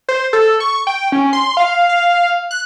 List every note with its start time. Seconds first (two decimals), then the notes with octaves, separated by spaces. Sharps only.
0.09 C5
0.33 A4
0.60 C#6
0.87 G5
1.12 C#4
1.33 C6
1.57 F5
1.89 F5
2.51 F#6